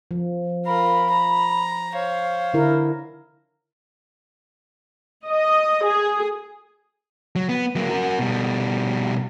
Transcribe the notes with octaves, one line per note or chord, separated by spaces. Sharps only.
F3
F4 A#4 B5
A#5
C5 C#5 F5
D3 E4 A#4
D#5
G#4
F#3
B3
F#3 A#3
F#4 A#4
B2 G3